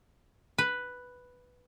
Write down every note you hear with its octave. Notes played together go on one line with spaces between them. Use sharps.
B4